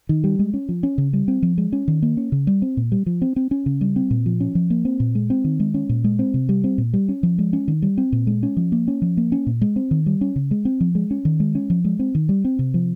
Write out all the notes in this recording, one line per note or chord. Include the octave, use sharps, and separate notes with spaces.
D#3
G3
G#3
C#4
F3
C#4
C#3
G3
C4
F3
G#3
C#4
D#3
A#3
C#4
C#3
G3
C4
A#2
G3
F3
C4
C4
C#4
C#3
G3
C4
A#2
F3
C#4
F3
A#3
C4
A#2
G#3
C4
D#3
G#3
C#4
A#2
G#3
C4
C3
G3
C4
A#2
G3
C#4
F3
G#3
C#4
D#3
G3
C4
A#2
G#3
C#4
F3
A#3
C#4
F3
A#3
C#4
A#2
G#3
C4
D#3
G3
C#4
C#3
G#3
C4
F3
G#3
C#4
D#3
G#3
C#4
F3
G#3
C4
D#3
G3
C4
C3
F3